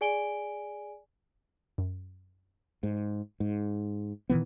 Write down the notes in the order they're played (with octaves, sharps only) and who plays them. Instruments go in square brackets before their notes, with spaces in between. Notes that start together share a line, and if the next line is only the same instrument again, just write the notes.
[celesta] G#4 D5 G#5 D7 G7
[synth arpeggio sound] F#2
[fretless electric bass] G#2
G#2
A#2 D#3 E3 B3